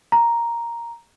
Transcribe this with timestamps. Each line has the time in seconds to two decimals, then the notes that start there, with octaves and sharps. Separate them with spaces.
0.12 A#5